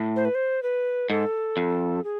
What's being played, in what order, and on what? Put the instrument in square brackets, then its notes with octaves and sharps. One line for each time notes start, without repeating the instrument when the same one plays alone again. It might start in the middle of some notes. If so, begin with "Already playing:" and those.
Already playing: [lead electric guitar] A2
[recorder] C5
B4
C5
B4
[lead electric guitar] G#2 [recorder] A4
[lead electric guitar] F2
[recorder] G#4